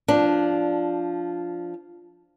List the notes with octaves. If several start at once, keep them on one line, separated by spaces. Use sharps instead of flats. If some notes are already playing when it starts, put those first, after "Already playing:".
F3 D4